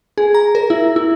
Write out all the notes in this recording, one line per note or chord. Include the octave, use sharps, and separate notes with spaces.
G#4
A#5
A#4
E4
E4